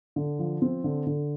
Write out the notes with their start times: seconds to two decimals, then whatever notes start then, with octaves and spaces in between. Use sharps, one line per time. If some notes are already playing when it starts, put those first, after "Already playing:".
0.16 D3
0.39 F3
0.62 C4
0.84 D3
1.07 D3